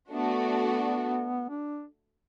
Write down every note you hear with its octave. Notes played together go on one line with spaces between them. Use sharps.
A3 B3 D4 F#4
D4